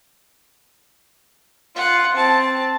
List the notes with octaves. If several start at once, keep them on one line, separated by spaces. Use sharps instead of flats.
F4 F#5
C4 A5